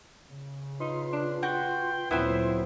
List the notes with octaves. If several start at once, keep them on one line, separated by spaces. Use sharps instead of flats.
C#3
D#4 F4 B4 C6
D4
F#4 G5
D2 A#2 F#3 B3 C4 E4 C5